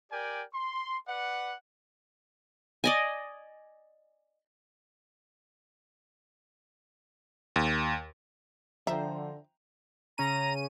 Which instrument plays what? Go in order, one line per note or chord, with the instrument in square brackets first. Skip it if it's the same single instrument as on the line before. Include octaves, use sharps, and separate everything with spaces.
[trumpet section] G4 A#4 D5 G5 G#5
C6
B4 D5 F#5
[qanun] D5 D#5 G#5
[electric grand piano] D#2
[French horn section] D3 [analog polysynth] F3 C5 [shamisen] E5 [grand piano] G5 A#5
[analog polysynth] C#3 C#4 D#7 [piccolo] A#5